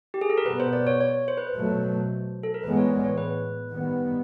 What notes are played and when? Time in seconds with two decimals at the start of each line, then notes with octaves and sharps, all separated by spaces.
0.14 G4
0.21 G#4
0.30 A4
0.37 A#4
0.45 B2 G3 B3 B4
0.60 C5
0.73 D5
0.87 C#5
1.01 C#5
1.28 C5
1.37 B4
1.47 C5
1.54 B2 F#3 A3
2.43 A4
2.54 A#4
2.63 A2 E3 G#3 B3 B4
2.77 C#5
2.90 D5
3.04 C#5
3.18 B4
3.72 D#3 G3 B3